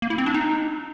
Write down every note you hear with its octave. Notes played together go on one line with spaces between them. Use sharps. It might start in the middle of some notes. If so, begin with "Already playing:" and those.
A#3
E4
C4
D4
D#4